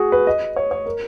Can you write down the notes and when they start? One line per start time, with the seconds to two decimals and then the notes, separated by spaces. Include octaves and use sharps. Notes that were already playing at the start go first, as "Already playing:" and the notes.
Already playing: F#4 G#4
0.12 B4
0.27 D#5
0.56 C#5
0.71 C#5
0.86 A#4